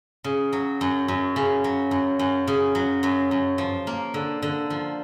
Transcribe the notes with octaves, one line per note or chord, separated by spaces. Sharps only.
C#3
F#3
F#2
F#2
C#3
F#3
F#2
F#2
C#3
F#3
F#2
F#2
F3
A#3
D3
D3
F3